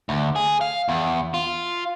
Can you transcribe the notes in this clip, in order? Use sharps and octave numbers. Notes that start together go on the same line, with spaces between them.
D2
G#4
F5
E2
F4